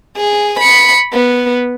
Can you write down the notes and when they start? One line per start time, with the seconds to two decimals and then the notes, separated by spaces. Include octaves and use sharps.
0.17 G#4
0.60 B5 C#7
1.13 B3